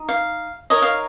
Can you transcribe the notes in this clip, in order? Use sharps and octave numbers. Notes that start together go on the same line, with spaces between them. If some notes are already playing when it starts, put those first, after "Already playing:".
Already playing: D#4
F5
D#4 A#4 C#5 D#5
F5